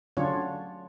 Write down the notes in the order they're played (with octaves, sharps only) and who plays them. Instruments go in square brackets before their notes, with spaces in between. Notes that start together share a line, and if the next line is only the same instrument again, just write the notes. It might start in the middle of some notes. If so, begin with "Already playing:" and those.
[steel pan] D3 F#3 C#4 D4 F4 C#5